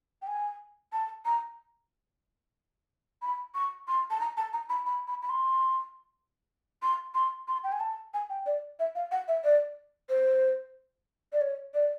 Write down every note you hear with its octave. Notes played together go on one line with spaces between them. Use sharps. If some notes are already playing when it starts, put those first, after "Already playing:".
G5
G#5
A5
A#5
B5
C#6
C6
A5
A#5
A5
A#5
B5
B5
B5
B5
C6
C6
C6
C6
G5
G#5
A5
G#5
G5
D5
E5
F5
F#5
E5
D5
C5
D5
C#5
D5